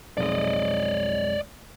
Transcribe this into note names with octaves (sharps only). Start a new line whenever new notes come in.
B1 F2 G#3 D5 D#5